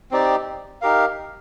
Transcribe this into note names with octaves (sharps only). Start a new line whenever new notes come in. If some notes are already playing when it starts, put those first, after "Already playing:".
C4 D#4 G4 D5
D#4 G4 A#4 F5